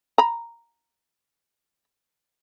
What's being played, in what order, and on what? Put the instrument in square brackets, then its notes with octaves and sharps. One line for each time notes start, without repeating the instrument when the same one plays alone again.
[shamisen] A#5 B5